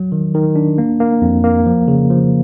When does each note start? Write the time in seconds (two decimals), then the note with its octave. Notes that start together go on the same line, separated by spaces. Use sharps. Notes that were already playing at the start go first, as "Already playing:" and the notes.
Already playing: F#3
0.12 D#3
0.34 D#3
0.56 D4
0.78 A#3
1.00 A#3
1.22 F2
1.44 A#3
1.66 F3
1.88 C#3
2.10 F3